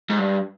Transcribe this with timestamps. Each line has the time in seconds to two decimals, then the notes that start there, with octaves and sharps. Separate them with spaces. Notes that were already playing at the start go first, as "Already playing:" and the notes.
0.09 G#2
0.19 G2